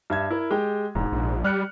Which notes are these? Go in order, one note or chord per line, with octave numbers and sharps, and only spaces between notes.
G2 E5 G#6
E4 A#4
G#3 G4 G5
E1 G#2
A#1
G3 F6 F#6 C#7